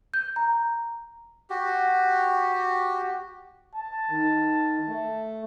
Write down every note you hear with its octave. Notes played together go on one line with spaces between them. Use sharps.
G6
A#5
F#4 G4
A5
D#3
A3